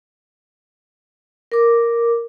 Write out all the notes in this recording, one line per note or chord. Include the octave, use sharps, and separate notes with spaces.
A#4 D6